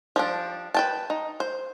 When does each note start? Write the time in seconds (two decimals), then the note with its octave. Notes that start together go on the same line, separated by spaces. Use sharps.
0.16 F3 G3 D4
0.74 B4 G5 A5
1.10 D#4
1.40 C5